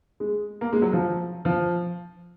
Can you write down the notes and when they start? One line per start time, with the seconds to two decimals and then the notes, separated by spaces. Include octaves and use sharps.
0.20 G#3
0.61 A#3
0.73 G#3
0.82 F#3
0.93 F3
1.45 F3